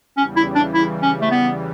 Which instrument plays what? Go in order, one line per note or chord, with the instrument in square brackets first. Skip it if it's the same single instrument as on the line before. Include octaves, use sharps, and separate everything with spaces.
[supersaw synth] E2 C#3 E3 G3 [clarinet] C#4
[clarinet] E4
D4
E4
C#4
A3
B3